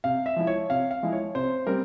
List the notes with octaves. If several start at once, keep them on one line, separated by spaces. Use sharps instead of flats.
C3 F5
E5
F3 G#3 E4
C#5
C3 F5
F5
F3 G#3 E4
C#5
C3 C5
G3 C4 A#4